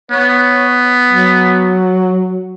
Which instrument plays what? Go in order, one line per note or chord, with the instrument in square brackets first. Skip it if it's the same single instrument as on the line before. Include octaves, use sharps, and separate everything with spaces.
[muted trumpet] B3 [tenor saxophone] C#5
[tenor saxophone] F#3